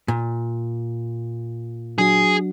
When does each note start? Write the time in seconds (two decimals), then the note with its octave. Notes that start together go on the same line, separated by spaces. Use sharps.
0.08 A#2
1.98 F#3 D4 F#4 G#4